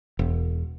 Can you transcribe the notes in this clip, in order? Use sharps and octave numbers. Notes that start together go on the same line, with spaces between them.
E1